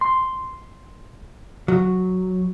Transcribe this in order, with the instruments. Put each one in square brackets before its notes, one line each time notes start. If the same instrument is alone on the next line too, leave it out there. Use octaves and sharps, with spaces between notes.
[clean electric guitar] C6
[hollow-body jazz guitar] F#3